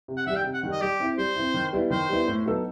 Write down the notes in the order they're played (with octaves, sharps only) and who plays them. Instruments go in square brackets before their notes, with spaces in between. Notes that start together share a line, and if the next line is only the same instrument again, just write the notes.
[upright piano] C3
[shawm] F#5
[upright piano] D#3 [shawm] E5
[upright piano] G3
[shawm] G5
[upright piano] C3
[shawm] F#5
[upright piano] D#3 G3
[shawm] D#5
[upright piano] G3 [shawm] G4
[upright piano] C4 E4
[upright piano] G3 [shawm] C5
[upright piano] C4 E4
D#3
G3 B3 E4
[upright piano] D#3 [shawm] C5
[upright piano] G3 B3 E4
A2
F#3 B3 D#4 A4